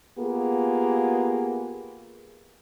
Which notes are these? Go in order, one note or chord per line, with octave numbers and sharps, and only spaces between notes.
A#3 B3 F4 G4 G#4